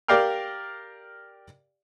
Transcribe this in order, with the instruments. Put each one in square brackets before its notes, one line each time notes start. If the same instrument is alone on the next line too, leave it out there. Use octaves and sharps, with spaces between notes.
[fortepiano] G4 A#4 D5 F5 G5 F6